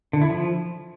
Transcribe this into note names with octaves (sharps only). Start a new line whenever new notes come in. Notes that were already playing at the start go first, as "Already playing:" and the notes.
D3
E4
F3